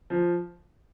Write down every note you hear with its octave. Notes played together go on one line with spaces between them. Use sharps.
F3